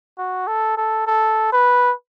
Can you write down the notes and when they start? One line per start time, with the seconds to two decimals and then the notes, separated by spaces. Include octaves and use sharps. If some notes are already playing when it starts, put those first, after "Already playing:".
0.18 F#4
0.47 A4
0.77 A4
1.07 A4
1.52 B4